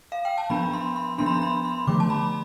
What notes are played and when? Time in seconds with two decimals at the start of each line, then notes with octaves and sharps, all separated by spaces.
0.12 F5
0.25 G5
0.38 A5
0.50 F3 B3 D4 B5
0.73 C6
0.96 C6
1.18 F3 B3 D4 C6
1.26 B5
1.34 C6
1.42 B5
1.65 C6
1.87 D3 F3 A3 D6
2.00 A5
2.10 B5